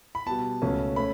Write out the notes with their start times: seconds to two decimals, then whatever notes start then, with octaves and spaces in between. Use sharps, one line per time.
0.15 B5
0.26 B2 G3 B3 A5
0.62 C#2 B2 A3 C#4
0.96 A3 C#4 B5